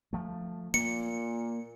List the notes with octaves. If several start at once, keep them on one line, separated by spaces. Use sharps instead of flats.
F3 A3
A#2 A#3 C#7